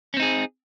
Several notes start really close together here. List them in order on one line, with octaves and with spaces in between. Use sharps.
C#4 C4 D#4 G#4